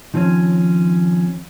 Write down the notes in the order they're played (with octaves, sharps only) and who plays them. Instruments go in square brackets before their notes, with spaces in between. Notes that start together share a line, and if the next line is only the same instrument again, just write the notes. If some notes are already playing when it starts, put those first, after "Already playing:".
[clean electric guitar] D#3 F3 C4 C#4